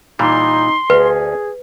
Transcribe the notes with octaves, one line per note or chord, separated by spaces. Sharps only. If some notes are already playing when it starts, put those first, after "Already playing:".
A#2 E3 G3 D#4 C6
D2 G#4 B4